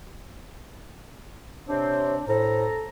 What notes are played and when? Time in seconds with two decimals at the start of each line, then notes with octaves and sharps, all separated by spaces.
1.68 C3 C4 D4 C#5
2.28 A2 A4 C5 A#5